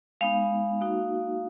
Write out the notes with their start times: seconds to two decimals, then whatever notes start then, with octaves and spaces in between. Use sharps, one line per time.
0.21 G#3 B3 D#4 F5
0.81 A#3 D#4 F#4